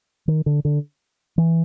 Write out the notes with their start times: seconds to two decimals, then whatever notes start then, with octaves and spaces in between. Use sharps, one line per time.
0.28 D#3
0.46 D3
0.65 D3
1.38 E3